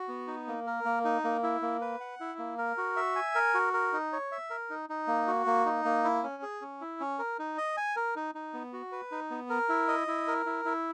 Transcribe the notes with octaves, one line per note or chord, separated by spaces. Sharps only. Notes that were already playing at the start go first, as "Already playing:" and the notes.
Already playing: F#4
B3
D#4
A#3
A#4
A#3
D#4
A#3
E4
A#3
B4
F#5
E4
A#3
A#4
F#4
E5
G#5
A#4
F#4
A#4
D#4
C#5
E5
A#4
D#4
D#4
A#3
F#4
A#3
D#4
A#3
E4
C#4
G#4
C#4
E4
C#4
A#4
D#4
D#5
G#5
A#4
D#4
D#4
B3
F#4
B4
D#4
B3
A#4
E4
D#5
E4
A#4
E4
E4